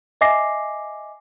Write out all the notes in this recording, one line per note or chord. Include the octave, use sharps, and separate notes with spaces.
D#5 E5 G#5 D6 A#6 C7